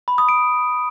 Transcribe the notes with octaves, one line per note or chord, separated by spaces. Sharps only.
B5
D#6
D7